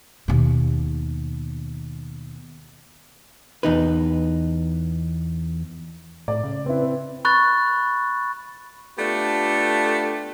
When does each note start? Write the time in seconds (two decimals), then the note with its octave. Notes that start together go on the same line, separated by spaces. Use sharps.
0.28 D#2 B2
3.63 E2 D#4 B4
6.28 A2 D5
6.44 C#3
6.66 C4 E4 B4
7.25 B5 C#6 F#6 A6
8.98 A3 B3 D4 F4 G4